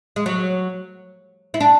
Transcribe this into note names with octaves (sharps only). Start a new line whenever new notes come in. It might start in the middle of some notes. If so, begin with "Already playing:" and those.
G#3
F#3
E4
D4